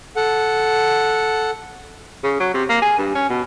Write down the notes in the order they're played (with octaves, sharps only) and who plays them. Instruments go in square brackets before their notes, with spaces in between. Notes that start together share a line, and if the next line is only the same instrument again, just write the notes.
[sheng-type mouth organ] A4 F#5
[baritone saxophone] C#3
F#3
C3
A#3
G#4
G2
C#4
B2